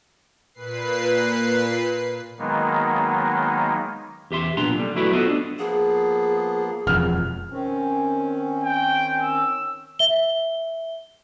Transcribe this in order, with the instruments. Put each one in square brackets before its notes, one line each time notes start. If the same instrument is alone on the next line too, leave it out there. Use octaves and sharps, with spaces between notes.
[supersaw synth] A#2 B4 C7
[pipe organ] D#3 F#3 G#3 A#3 B3 D#4
[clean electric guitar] E2 G4 E5 C6
B1 A#2 B3 D4 A#5 C6
D3 G3
F#3 A3 E4 F#4 B4 D5
B3 F4 F#4 A4 C5 D#5
D4
[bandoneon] F3 A#3 B3 [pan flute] G#4
[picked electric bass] E1 F2 [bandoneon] B3 [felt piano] F6
[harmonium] D#3 C4 C#4
[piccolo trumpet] G5
E6
[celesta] E5 G7